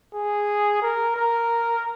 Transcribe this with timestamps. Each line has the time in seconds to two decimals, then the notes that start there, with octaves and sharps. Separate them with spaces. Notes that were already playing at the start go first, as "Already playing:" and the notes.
0.13 G#4
0.82 A#4
1.16 A#4